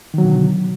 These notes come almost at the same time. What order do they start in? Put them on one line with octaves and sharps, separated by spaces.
D#3 F#3 B2 D3